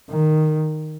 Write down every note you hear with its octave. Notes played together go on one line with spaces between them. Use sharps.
D#3